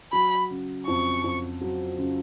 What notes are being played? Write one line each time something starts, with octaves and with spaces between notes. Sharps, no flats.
F#3 B5
C#3
F2 C#6
F2
F#3
C#3